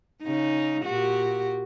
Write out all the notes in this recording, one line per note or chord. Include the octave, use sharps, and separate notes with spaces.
C#3 D#4
A#2 F#4 G4